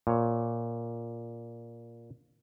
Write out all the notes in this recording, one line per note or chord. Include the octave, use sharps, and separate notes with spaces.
A#2 C#5